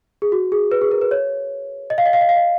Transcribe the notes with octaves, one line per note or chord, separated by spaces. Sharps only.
G#4
F#4
G#4
B4
G#4
A#4
B4
C#5
D#5
F5
D#5
F5
D#5
F5
D#5